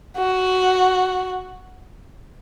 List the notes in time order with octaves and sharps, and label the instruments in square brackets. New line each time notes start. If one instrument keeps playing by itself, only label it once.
[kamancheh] F#4